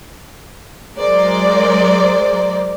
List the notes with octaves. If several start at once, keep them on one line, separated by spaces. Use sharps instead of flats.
F#3 G#3 A#4 C5 D5